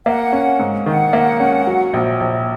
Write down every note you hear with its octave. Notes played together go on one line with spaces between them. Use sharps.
A#3 F#5
C#4
G#2
D#3 F#5
A#3
C#4
F#3
A#1
A#1